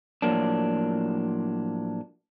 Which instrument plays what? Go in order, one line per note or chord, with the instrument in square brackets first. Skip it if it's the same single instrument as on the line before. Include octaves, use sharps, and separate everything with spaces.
[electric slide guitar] A2 F3 F#3 A#3 D4